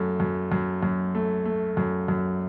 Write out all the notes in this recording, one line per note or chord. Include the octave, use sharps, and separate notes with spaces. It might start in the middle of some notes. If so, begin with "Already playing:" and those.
Already playing: F#2 A3
F#2
F#2
F#2
A3
A3
F#2
F#2